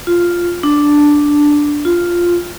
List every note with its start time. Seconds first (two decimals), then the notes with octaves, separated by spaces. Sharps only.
0.07 F4
0.63 D4
1.85 F4